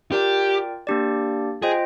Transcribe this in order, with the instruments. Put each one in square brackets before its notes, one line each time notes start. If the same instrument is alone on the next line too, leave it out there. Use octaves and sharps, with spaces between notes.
[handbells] F4 A#4 D5 G5 [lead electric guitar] G4
[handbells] A#3 D4 G4 D5
[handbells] F4 C5 D#5 G5 [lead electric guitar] G#4